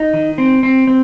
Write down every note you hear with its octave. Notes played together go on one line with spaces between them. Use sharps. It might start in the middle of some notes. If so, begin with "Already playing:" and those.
Already playing: D#4
D#3
C4
C4
C4